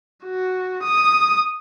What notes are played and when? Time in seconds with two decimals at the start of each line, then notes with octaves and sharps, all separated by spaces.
0.25 F#4
0.83 D#6